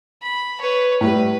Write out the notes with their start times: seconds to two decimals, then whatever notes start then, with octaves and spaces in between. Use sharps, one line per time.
0.22 B5
0.61 B4 C#5
1.01 A2 G3 B4